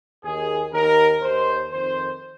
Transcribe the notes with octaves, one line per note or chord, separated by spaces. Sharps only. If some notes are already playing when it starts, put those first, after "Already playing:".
D#2 D#3 G#4
D#2 D#3 A#4
D#2 D#3 C5
F2 D#3 C5